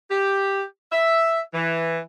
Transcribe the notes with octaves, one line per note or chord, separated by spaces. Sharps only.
G4
E5
E3